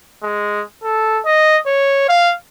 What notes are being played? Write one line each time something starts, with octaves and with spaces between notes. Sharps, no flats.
G#3
A4
D#5
C#5
F5